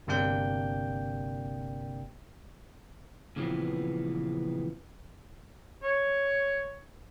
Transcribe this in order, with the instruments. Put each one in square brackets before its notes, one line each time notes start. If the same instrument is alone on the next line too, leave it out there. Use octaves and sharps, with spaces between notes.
[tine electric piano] G1 C3 A#3 D4 G5 G6
[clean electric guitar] A#2 C#3 E3 F3 B3 C4
[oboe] C#5